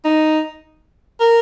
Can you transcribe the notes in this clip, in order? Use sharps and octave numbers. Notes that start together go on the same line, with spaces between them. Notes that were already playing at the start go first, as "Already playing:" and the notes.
D#4
A#4